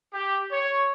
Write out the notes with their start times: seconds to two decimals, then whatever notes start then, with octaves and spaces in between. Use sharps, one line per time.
0.14 G4
0.52 C#5